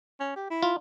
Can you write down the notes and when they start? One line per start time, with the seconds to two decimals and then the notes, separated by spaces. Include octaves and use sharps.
0.20 C#4
0.36 G4
0.50 E4
0.63 F4